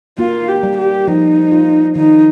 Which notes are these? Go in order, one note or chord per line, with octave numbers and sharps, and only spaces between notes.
A#3 F4
G4
G3
G4
F3 D#4
F4
D#3 D#4